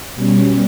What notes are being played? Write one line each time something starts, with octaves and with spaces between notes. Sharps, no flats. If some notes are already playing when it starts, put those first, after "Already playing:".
B2 G3 C#4